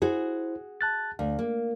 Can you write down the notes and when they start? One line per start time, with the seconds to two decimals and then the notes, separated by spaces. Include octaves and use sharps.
0.02 E4 F#4 G#4 C5
0.81 A5 F#6 A6
1.19 D2 F5
1.39 A#3